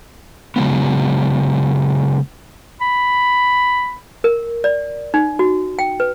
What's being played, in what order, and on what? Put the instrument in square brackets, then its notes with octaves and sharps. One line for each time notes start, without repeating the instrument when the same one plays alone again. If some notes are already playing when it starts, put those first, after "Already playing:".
[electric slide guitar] C#3 F#3 G#3 B3
[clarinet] B5
[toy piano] A#4
D5
D#4
F#4
G5
B4